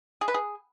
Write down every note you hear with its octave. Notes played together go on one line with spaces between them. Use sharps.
G#4
B4
G#4